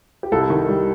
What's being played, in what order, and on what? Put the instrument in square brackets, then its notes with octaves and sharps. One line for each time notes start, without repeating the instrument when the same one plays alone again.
[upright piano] G4
C2 A4
D#3
G3